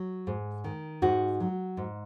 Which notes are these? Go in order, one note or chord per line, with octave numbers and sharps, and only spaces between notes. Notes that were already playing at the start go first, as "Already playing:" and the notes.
Already playing: F#3
G#2
D#3
G#2 D#4 F#4
F#3
G#2